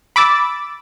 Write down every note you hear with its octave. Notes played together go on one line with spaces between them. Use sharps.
B5 D6 E6 A6